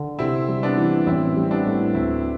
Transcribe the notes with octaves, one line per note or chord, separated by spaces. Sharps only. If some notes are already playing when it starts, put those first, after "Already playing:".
Already playing: D3
C3 C4 E4
G3
B3 D4
E3
A1 C4 E4
G3
C4
B3 D4
A2
D2 C4 E4